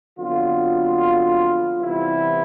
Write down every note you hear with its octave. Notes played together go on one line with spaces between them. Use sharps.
F2 D3 F#3 B3 F4
C3 E3 G3 B3 E4